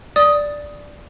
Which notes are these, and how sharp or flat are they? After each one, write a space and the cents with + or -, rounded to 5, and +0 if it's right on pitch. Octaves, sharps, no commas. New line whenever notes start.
D5 +0 D#6 +5